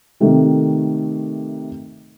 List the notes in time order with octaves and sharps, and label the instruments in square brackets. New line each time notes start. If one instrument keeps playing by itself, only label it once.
[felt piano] C3 D#3 A3